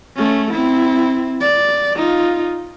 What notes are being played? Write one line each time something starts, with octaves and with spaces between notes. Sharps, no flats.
A3 C#4
C4 E4
D5
D#4 F4